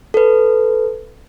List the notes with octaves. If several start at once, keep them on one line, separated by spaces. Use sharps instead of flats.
A4 B4